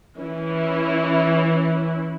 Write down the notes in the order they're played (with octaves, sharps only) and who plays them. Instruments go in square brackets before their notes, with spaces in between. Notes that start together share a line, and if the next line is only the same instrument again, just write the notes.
[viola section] E3 C#4 E4